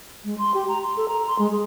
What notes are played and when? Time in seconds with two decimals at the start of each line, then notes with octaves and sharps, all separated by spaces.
0.25 G#3
0.38 C6
0.54 G4
0.68 A#5
0.82 C6
0.97 A4
1.08 A#5
1.27 C6
1.39 G#3
1.51 G#4